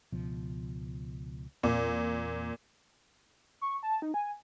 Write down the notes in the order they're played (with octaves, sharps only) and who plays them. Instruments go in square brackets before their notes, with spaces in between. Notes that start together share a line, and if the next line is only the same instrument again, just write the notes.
[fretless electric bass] C#2 B2 F3
[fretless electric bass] E2 C4 [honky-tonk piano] A#2
[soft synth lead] C#6
A5
D#4
G#5